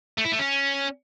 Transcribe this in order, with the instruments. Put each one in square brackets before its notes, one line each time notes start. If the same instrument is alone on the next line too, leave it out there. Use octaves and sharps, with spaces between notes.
[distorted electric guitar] A3
E4
A3
C#4